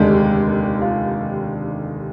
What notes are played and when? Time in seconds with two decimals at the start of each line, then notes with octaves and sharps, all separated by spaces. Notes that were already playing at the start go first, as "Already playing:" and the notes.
Already playing: F1 D#2 D3 G#3 D4 G4
0.81 F4